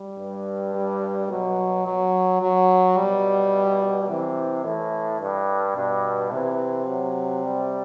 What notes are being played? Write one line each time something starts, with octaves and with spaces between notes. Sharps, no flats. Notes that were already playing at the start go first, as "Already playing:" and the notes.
Already playing: G3
G2
G3
B2 F#3
F#3
F#3
B2 G3
C3 E3
A2 E3
G2
G2 B2
C3 E3
F#3
G3